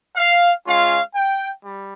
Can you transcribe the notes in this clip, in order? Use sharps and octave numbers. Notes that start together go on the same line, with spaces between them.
F5
G#3 C#4 F4 F5
G5
G3